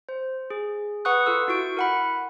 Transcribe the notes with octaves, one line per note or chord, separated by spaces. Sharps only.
C5
G#4
B4 F#5 C#6 D#6 F#6
F4 A4 E6
E4 F#4 C#6 D7
A#4 F#5 B5